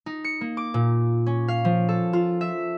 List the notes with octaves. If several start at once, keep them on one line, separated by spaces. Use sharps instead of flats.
D#4
C#7
A#3
D6
A#2
C#4
F5
F3
A4
F4
E5